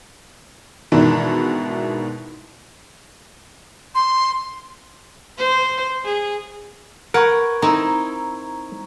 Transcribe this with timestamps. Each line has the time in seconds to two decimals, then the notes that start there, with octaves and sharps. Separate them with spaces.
0.92 G#2 B2 D#3 E3 D4 E4
3.95 C6
5.38 C5
6.05 G#4
7.14 A#4 B4 F#5 C#6 G#6 D7
7.62 C4 D#4 E4 A#5